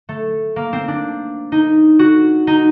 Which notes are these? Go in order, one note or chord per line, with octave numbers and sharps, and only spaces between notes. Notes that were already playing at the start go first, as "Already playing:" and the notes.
A3
A#3
C4
D4
D#4
F#4
D#4